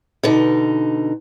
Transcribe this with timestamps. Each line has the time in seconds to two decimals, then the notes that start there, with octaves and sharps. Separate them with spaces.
0.23 B2 D3 D#4